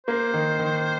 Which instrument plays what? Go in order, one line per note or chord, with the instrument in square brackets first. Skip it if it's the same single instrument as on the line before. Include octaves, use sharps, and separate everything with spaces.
[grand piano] A#3 [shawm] C5
[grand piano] D#3
D#3